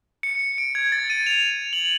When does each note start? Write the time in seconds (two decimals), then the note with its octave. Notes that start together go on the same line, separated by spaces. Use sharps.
0.23 C#7
0.58 D7
0.75 G#6
0.92 A6
1.10 D#7
1.26 F7
1.73 F#7